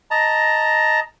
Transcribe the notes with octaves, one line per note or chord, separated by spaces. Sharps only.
D#5 A5 A#5